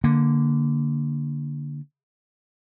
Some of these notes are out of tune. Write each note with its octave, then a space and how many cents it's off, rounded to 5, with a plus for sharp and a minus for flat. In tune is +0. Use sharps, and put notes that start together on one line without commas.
D3 +0 A#3 +0